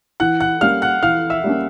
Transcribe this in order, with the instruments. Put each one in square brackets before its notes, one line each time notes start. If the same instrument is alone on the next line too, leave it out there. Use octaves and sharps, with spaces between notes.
[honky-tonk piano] E3 [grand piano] F#5 F#6
[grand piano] F#5 F#6
[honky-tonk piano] G3 A#3 C#4 [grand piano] F5 F6
[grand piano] F#5 F#6
[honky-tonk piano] E3 [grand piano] F5 F6
[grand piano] E5 E6
[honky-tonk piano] G3 A#3 C#4